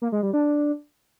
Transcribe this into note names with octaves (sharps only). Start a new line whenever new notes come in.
A#3
G#3
G3
D4